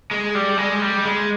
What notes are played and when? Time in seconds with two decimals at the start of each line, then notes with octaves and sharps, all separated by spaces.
0.11 G#3
0.35 G3
0.58 G#3
0.82 G3
1.05 G#3